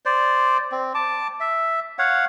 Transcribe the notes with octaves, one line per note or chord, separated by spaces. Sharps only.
C5 D5
C4
A5 D6
E5
C#5 F5 F#5